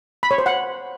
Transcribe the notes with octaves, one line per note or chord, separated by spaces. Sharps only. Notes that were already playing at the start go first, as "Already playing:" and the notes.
B5
C#5
C5
F#5